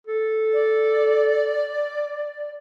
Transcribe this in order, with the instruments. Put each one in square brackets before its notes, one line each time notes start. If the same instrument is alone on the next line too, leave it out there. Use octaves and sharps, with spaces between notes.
[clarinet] A4
[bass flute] D5